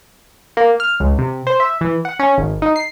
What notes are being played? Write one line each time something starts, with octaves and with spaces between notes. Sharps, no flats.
A#3
F6
C#2
C3
C5
E5
E3
F#5
C#4
G#1
D#4
C7